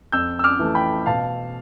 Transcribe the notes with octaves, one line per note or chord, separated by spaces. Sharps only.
F2 E6 G6
E6
D6 F6
E3 A3
G5 B5
B2 F5 A5